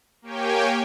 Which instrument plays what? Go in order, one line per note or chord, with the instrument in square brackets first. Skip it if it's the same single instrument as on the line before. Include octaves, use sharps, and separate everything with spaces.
[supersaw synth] A#3 G4 C#5 G5 G#5